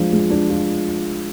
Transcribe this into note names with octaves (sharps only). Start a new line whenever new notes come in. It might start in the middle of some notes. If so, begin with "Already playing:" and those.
Already playing: F3 G#3 D4 F4
G#3
D4
F4